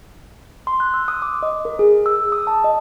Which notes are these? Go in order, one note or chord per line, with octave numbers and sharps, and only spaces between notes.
C6
F#6
E6
D#6
D6
D#5
A#4
G#4
E6
D#6
A5
D#5